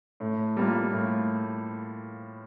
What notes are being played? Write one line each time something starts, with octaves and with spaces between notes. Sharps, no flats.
A2
G3 A#3 F4
A2